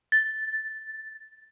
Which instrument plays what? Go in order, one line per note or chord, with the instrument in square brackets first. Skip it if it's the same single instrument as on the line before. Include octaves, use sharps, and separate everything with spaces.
[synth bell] A6